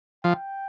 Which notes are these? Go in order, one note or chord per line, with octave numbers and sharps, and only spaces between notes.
F3 G5